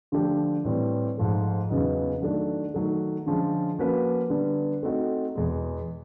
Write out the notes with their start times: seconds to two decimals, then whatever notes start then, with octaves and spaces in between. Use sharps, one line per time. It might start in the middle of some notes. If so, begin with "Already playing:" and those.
0.12 D3 F3 A3 D4 G4
0.65 A2 E3 G3 C4
1.18 G#2 F3 A3
1.69 E2 C#3 F#3 B3 D#4
2.22 D#3 F#3 A3 D4
2.74 D#3 F#3 A3
3.26 D3 F3 G#3 C#4
3.78 F3 A#3 C#4 F#4 B4
4.30 D3 G3 B3
4.82 A3 C4 D#4 F#4 A4
5.35 E2 B2 G#3